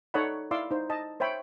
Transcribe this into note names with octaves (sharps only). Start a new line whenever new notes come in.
D#4 A4 C#5 D5 F#5 B5
E4 D5 F5 C6 D6 E6
D#4 C5
D#5 A5
C5 C#5 E5 G5 B5